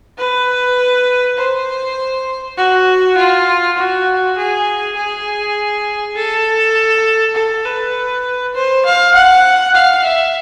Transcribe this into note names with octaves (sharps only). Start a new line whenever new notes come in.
B4
C5
F#4
F4
F#4
G#4
G#4
A4
A4
B4
C5
F5
F#5
F5
E5